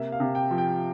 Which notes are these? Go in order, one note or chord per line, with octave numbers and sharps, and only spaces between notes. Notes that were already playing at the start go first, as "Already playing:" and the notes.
Already playing: C3 A#3 E5
F5
C3
G5
F3
G5